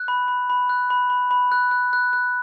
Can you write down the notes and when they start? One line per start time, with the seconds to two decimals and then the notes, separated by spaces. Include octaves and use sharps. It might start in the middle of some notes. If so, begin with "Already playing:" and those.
Already playing: F#6
0.08 B5
0.28 B5
0.50 B5
0.69 F#6
0.90 B5
1.10 B5
1.31 B5
1.52 F#6
1.71 F#6
1.93 F#6
2.13 F#6